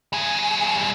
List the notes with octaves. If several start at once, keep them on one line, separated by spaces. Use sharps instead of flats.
G3 G#4